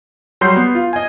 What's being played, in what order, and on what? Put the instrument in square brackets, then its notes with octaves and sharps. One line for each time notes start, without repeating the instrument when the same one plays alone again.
[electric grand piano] F#3 G3 C6 G6 C7
B3
F4
D#5 G#5